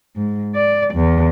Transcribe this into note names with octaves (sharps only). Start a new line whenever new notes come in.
G#2
D5
E2